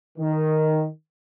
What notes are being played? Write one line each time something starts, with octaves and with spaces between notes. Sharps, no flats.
D#3